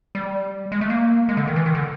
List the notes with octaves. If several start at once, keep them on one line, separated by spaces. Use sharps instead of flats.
G3
G#3
A3
A#3
G#3
D3
D#3
E3
D#3
D3